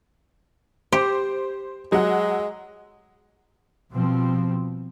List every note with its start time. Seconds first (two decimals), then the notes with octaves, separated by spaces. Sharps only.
0.93 G4 C5
1.92 F#3 G#3 F#5
3.93 B2 F3 G3 C4